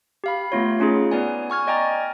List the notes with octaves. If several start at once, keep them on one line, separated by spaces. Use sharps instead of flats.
G4 F5 B5
A3 B3 F4 C#5
C#4 D#4 F4 G#4
B3 B4 D5 G#5
G#5 C#6 F6 G#6
D5 D#5 G5 G#5 A#5 A6